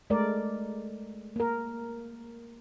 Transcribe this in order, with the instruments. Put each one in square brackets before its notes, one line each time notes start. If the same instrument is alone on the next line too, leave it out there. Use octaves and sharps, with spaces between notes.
[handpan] G#3 A3 A#4 D5
A#3 A#4